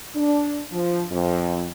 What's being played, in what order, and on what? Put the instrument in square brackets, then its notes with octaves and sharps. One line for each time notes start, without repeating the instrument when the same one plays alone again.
[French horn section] D4
F3
F2